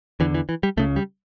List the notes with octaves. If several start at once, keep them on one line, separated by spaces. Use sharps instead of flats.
E2 D3 E3
E3
E3
G3
C#2 C#3 A3
G3